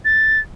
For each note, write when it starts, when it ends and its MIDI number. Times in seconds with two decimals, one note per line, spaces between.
0.05 0.40 93